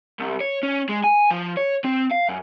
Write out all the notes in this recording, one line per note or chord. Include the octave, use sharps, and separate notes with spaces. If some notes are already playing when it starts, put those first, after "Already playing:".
C2
C#5
C#4
G#3
G#5
F3
C#5
C4
F5
F#2